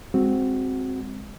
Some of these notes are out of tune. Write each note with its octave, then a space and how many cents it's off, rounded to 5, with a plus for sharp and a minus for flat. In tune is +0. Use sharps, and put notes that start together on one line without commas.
G#3 -20 C4 +0 F#4 +0